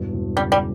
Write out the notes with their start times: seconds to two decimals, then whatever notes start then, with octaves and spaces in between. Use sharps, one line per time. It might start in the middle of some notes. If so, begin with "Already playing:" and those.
Already playing: E1 G2
0.13 E1
0.36 C#3 G3
0.52 G3